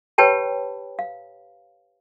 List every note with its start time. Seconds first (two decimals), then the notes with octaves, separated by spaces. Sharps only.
0.18 G4 B4 C#5 G5 A5 B5
0.99 F5